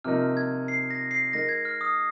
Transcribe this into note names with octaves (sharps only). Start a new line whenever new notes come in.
C3 F3 A#3 D#4 F6
G#6
C7
A#6
C7
G#3 D#4 A#4 A#6
G#6
F6
D#6